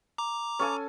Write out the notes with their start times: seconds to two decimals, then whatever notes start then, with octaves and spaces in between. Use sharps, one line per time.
0.18 A#5 D6
0.59 C#4 A4 G#5